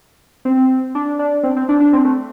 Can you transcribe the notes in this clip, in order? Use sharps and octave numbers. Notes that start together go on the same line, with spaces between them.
C4
D4
D4
C4
C4
D4
D4
C4
A3